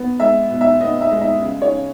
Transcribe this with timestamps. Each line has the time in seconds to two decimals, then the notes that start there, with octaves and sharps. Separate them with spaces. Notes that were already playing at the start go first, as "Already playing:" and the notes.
Already playing: B3
0.20 G#3 E5
0.50 B2
0.61 E5
0.81 B3 D#5
1.01 E5
1.11 G#3
1.21 E5
1.42 C#3
1.62 C#5
1.71 C#3